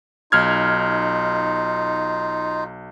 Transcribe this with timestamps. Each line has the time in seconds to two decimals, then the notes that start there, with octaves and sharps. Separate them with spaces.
0.32 B1 D#4 F4 F6 G#6